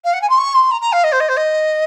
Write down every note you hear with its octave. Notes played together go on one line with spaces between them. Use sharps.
F5
F#5
G#5
C6
C#6
C6
A#5
A#5
F5
D#5
C5
D#5
C5
D#5